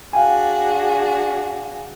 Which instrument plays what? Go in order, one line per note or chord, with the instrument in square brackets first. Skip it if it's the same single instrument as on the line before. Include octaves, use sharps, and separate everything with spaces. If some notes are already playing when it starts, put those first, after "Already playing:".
[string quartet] D4 F#4 G#4 [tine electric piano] F5 G5 G#5